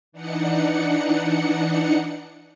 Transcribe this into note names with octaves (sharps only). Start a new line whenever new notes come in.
E3 D4 D#4 F#5 C#7